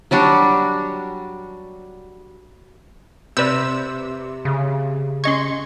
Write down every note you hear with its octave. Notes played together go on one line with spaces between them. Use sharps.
F#3 G3 D4 F#4
C3 B4 D5 E6 G6
C#3
C#4 D#5 C6 C#6 G#6